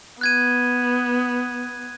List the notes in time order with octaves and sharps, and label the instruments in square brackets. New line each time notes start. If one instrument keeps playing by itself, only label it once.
[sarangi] B3 [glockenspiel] F#6 G#6 D#7